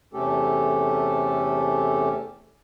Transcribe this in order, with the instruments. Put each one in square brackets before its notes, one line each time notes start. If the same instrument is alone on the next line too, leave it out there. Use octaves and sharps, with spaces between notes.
[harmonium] E2 C3 A3 C#4 G4 A4